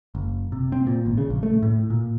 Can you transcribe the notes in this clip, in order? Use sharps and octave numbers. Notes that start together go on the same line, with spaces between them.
F#1
C3
C4
A#2
G#1
C#3
A#1
A3
A2
A#2